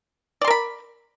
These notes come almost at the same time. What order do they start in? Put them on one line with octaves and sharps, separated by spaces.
D5 C6 A#4 B5